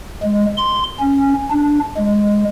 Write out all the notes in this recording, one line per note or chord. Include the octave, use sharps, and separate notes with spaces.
G#3
C6
C#4
D4
G#3